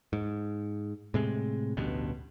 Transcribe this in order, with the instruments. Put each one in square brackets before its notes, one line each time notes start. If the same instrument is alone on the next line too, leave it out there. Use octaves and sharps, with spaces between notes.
[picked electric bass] G#2
A2 C3 G#3
A1 D2 G2 B2